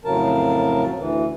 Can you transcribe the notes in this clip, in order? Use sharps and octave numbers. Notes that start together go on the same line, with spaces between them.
F2 A2 C#3 F#3 A#4 A5
D2 E3